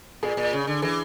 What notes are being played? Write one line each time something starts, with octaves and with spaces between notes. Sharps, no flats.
A#2 G#4
A#2
C#3
D3
E3 G#4